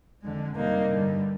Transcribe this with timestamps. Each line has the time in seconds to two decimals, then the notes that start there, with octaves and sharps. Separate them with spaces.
0.22 F2 D3 G#3
0.55 F2 C3 G3 A#3 D#4
0.88 G2 D3 G3